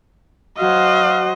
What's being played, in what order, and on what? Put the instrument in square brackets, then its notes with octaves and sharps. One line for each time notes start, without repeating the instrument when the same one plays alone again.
[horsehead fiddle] F#3 C5 [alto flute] F#4 [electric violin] D#5 [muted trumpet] F5